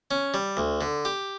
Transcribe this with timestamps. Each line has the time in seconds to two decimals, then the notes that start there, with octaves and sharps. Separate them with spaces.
0.11 C#4
0.34 G3
0.57 D2
0.81 D3
1.05 G4